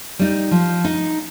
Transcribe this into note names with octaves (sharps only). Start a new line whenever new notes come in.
G3 D#4
F3
D#4